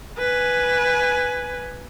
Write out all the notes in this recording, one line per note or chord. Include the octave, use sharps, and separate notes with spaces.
B4 G#5